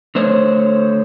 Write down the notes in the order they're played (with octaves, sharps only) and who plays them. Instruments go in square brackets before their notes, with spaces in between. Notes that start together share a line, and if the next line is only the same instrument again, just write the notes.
[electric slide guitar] D3 A3 C5 C#5